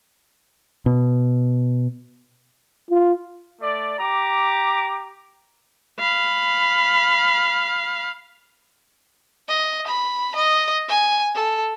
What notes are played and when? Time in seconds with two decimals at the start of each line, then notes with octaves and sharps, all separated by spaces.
0.86 B2
2.91 F4
3.61 A3 D5
3.99 G4 A#5 D6
6.00 F5 B5
9.48 D#5
9.87 B5
10.35 D#5
10.88 G#5
11.35 A4